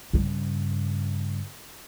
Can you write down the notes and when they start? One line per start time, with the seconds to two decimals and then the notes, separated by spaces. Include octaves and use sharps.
0.13 G2 C#3